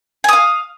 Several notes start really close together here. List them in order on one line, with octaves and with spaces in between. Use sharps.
G#5 D#6 F5